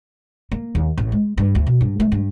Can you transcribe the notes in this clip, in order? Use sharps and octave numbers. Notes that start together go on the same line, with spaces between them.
A#3
D#2
A1
G#3
G2
D2
B2
G2
A3
G2